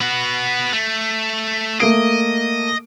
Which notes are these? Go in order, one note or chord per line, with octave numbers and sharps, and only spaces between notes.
B3 F#4
A3
A3 A#3 D#5 D7